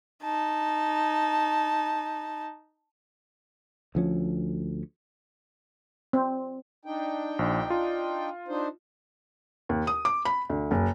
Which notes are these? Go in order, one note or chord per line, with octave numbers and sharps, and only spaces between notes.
D#4 A5
D2 F3 C#4
C4
D4 D#4 G5
A#1
F4
D4 D#4 C5
D#2
D#6
D6
B5
D2
F#1